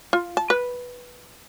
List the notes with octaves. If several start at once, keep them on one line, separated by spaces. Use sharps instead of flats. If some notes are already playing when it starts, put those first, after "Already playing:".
F4
A5
B4